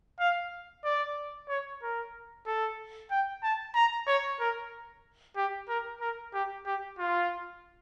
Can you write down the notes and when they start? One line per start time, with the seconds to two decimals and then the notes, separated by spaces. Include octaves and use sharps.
0.20 F5
0.84 D5
1.49 C#5
1.82 A#4
2.47 A4
3.11 G5
3.43 A5
3.75 A#5
4.07 C#5
4.40 A#4
5.36 G4
5.69 A#4
6.01 A#4
6.34 G4
6.66 G4
6.99 F4